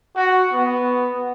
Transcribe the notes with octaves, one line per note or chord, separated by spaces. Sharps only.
F#4
B3